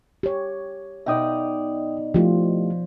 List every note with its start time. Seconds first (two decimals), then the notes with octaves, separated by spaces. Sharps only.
0.23 G4 C#5
1.06 B2 D#4 D5 E5 G5 D#6
2.14 F3 A3 E4 F4 G4